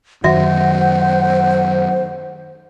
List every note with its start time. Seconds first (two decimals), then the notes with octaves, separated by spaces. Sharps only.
0.24 F#2 D#3 F#4 C5 E5 F#5